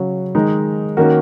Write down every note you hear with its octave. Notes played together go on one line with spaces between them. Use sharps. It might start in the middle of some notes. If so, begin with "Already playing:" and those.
Already playing: C#3 F#3 C#4 F#4 C#5
D#3 G#3 D#4
D#3 A#3 C#4 F#4 A#4